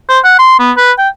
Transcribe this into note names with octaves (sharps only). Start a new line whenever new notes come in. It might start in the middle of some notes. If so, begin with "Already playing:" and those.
C5
F#5
C6
B3
B4
G5